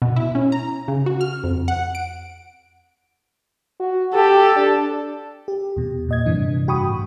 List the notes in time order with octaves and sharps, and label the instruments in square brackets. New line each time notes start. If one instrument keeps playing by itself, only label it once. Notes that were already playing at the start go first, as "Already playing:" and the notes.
[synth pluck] B2
E4
C#4
A#5
C#3
F#4
F6
F2
F#5
D7
[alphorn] F#4
[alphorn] G4 [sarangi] A4
[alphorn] D4
[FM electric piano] G4
E2 B2
A#2 D#5 G#6
G2 C3 E3 D4
G2 F#4 G5 B5 C#6 D#6
A2